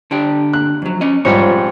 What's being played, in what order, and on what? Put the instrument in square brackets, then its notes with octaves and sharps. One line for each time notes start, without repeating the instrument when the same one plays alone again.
[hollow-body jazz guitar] D3 D4 G4
[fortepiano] F#6
[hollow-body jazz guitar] F2 F#3
C#4 D#5
[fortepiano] G#2 F3 G3 [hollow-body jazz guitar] C#5